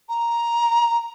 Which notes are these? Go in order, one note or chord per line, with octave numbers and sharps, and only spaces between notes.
A#5